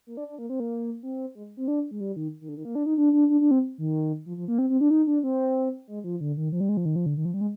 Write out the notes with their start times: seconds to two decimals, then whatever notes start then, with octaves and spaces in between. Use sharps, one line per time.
0.07 A#3
0.17 D4
0.28 D4
0.39 A#3
0.50 C4
0.60 A#3
1.03 C4
1.35 G#3
1.57 C4
1.68 D4
1.91 G#3
2.00 G3
2.16 D#3
2.41 D#3
2.49 D3
2.57 D#3
2.65 A#3
2.75 D4
2.86 D#4
2.98 D4
3.13 D4
3.30 D4
3.41 D4
3.51 C4
3.78 D#3
4.26 F3
4.37 F3
4.48 A#3
4.58 C4
4.70 C4
4.81 D4
4.91 D#4
5.07 D4
5.23 C4
5.88 G#3
6.04 F3
6.21 D3
6.37 D#3
6.52 F3
6.60 G3
6.69 G#3
6.77 F3
6.85 D#3
6.96 F3
7.06 D3
7.17 D#3
7.25 F3
7.34 G3
7.41 G#3